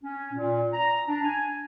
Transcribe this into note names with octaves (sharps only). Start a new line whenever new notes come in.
C#4
A#2
A#5
D4
G#5